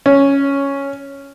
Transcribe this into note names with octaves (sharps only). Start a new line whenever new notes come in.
C#4